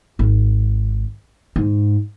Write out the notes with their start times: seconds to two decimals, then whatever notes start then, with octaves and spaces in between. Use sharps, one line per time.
0.19 G#1
1.56 G#2